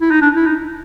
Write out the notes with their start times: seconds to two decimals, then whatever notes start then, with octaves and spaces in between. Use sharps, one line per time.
0.01 E4
0.11 D#4
0.21 D4
0.36 E4
0.46 D#4